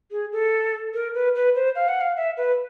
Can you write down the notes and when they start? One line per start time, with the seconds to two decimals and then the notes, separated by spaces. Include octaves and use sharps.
0.11 G#4
0.32 A4
0.94 A#4
1.15 B4
1.35 B4
1.55 C5
1.75 F5
1.88 F#5
2.01 F5
2.16 E5
2.37 B4